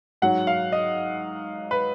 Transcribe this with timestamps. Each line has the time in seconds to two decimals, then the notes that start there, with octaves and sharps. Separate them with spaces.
0.22 G#2 F#3 F#5
0.47 F5
0.72 D#5
1.71 B4